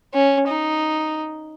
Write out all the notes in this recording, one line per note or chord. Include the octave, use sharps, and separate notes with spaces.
C#4
D#4